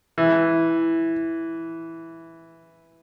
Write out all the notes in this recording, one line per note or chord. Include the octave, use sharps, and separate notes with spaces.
E3